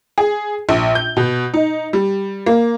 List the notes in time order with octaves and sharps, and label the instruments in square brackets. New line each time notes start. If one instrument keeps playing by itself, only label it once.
[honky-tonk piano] G#4
A#1
G6
B2
D#4
G3
A#3